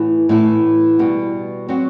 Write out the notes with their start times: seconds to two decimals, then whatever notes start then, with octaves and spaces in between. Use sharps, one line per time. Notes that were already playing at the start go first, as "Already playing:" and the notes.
Already playing: A2 E3 B3
0.29 A2 E3 B3 E4
0.99 B2 G3 B3
1.68 F#3 C4 F#4